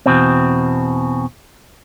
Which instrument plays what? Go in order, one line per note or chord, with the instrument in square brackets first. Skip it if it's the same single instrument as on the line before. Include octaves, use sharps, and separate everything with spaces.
[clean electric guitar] E2 B2 C4